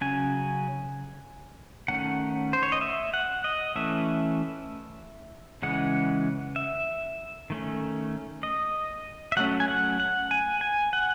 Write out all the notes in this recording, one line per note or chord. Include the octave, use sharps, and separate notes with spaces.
C#3 F#3 C#4 G#5
D#3 A3 C#4 F#5
C5
C#5
D#5
E5
F#5
D#5
E3 A3 C#4 E5
C#3 E3 G#3 C#4 F#5
E5
D#3 A3 C#4
D#5
E5
F#3 A3 C#4 F#5
G#5
F#5
F#5
G#5
G#5
F#5